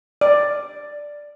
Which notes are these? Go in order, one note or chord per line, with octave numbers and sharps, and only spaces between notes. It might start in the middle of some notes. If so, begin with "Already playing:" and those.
D5